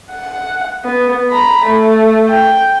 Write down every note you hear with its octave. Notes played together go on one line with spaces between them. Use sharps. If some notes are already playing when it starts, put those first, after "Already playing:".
F#5
B3
A#5 B5
A3
G5